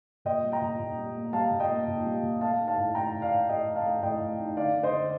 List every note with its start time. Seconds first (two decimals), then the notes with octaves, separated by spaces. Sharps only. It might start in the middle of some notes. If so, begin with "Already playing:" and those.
0.25 A#2 D#5 G5
0.43 G3
0.52 G5 A#5
0.61 A#2
0.79 A#2
0.97 G3
1.16 A#3
1.33 G3 F5 A5
1.51 A#2
1.60 D#5 G5
1.69 A#3
1.87 A#2
2.05 G3
2.23 A#2
2.41 A3 F5 A5
2.59 D#4
2.68 F5 A5
2.77 A2
2.95 A2 G5 A#5
3.12 A2
3.22 D5 F5
3.32 A2
3.49 A2 D#5 G5
3.67 A2
3.75 F5 A5
3.85 A3
4.02 A2 D#5 G5
4.21 A2
4.39 D#4
4.57 D3 D5 F5
4.75 D3
4.83 C5 D#5
4.92 D3